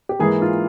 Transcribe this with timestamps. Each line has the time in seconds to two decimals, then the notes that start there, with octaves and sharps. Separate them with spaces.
0.09 G4
0.19 G#2 E3 A#3 G#4
0.42 F4